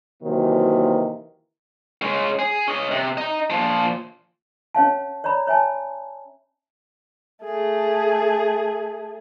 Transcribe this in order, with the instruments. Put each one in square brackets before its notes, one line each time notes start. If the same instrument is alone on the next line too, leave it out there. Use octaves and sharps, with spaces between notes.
[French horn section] C3 D#3 E3 F#3 A#3
[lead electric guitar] G#3 C#4
G#4
C#4 D#5
C3
D#5 A#5
A#2 F3
[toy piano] C#4 C#5 F5 A5
C#5 D5 A#5 B5
C#5 E5 G#5 A5
[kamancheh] A3 G#4